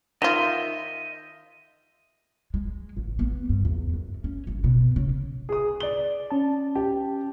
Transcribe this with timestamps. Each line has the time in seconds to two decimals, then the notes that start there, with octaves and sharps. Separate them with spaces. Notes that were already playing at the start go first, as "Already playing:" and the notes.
0.22 D#3 F4 D#5 E5 G5
2.54 G#3
2.97 A1
3.19 B3
3.49 G2
3.65 E2
3.94 F#2
4.24 C#4
4.47 G1
4.64 B2
4.96 C#3
5.49 G#4 D#6
5.80 D5 G7
6.31 C#4 A5
6.76 G4